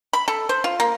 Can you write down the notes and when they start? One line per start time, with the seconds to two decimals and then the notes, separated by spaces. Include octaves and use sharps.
0.13 B5
0.28 A4
0.49 C5
0.64 F4
0.80 A#3